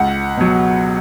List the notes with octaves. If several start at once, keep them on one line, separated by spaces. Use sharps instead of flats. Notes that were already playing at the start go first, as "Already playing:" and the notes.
Already playing: C#2 F#5
B2 F#3